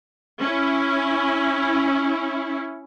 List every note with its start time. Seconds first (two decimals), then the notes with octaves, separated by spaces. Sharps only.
0.40 C#4 E4